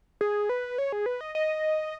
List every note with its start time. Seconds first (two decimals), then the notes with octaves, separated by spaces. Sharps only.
0.21 G#4
0.49 B4
0.78 C#5
0.92 G#4
1.06 B4
1.21 D#5
1.35 D#5